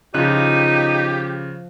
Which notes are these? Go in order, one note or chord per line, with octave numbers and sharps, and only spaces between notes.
C#3 F3 D#4 F4 G4 F#6